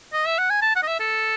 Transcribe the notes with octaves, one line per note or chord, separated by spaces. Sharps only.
D#5
E5
F#5
G#5
A5
F#5
D#5
E5
A4